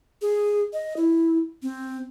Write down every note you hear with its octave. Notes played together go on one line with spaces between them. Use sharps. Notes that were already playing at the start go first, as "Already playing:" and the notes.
G#4
D#5
E4
C4